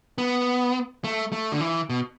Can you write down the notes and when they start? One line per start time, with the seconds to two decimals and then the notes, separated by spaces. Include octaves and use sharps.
0.18 B3
1.04 A3
1.32 A3
1.52 D3
1.61 E3
1.90 B2